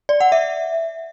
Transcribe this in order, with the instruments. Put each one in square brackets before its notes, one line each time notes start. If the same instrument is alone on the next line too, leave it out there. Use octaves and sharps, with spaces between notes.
[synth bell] D5
F#5
E5